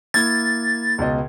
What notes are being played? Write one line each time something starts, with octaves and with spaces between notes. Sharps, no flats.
A#3 E4 G#6 A6
C#2 B2 D#5